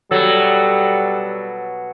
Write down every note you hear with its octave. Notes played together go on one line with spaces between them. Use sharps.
B2 F#3 G3 A4